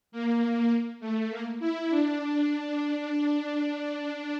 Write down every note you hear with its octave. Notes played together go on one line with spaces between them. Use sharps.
A#3
A3
A#3
E4
D4